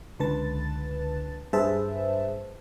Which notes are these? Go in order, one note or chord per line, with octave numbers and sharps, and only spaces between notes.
C#2 D3 B4 A5 A6
G2 G#4 B4 C5 E5 A5